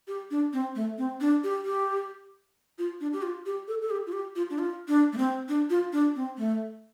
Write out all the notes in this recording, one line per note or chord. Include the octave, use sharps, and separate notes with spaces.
G4
D4
C4
A3
C4
D4
G4
G4
F4
D4
G4
F4
G4
A4
A4
G4
F4
G4
F4
D4
F4
D4
A3
C4
D4
F4
D4
C4
A3